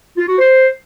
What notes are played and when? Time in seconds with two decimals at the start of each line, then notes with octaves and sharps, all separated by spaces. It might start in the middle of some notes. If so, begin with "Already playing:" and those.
0.18 F4
0.28 F#4
0.38 C5